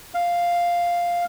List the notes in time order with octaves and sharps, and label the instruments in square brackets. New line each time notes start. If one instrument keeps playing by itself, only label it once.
[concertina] F5